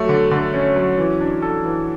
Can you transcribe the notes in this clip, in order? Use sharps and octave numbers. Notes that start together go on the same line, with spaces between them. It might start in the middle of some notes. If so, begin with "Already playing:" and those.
Already playing: F#3 A3
D3
D3
C#4
F#3
E3
D4
A4
E3